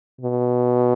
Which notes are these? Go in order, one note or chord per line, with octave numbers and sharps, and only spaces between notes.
B2